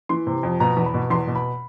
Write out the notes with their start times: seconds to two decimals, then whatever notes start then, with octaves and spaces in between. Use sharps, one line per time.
0.09 E3 C6
0.27 C3
0.43 F2
0.60 B2 A#5
0.77 E2
0.86 B5
0.94 B2
1.10 E2 C6
1.27 B2
1.35 B5